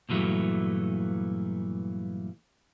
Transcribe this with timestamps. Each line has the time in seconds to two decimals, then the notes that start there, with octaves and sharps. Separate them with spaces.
0.09 G2 A#2 E3 F#3 A3